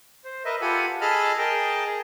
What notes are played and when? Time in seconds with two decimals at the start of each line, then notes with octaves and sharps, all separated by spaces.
0.25 C5
0.45 A#4 B4 D#5 E5
0.61 F4 G4 A4 F#5 G#5 B5
1.01 G#4 A4 D#5 A5 B5 F6
1.38 G#4 A#4 D#5 G5 A5
1.86 G#4